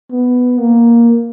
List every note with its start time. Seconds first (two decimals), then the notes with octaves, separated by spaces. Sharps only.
0.11 B3
0.60 A#3